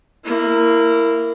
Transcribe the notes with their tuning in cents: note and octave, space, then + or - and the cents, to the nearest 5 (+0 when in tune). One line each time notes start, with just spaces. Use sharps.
A#3 -10 E4 +10